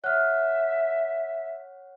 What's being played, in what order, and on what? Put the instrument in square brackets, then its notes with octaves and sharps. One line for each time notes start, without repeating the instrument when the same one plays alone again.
[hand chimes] C#5 F#5 [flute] E5 [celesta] F6 F#6